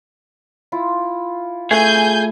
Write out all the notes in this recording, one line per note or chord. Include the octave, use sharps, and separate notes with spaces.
E4 F4
A3 G#4 G#5 G6